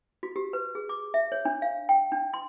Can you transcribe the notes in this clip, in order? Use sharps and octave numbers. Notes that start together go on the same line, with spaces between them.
F#4
G4
B4
G#4
D6
E5
C#5
D4
F5
G5
D4
C6